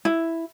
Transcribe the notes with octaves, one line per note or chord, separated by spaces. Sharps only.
E4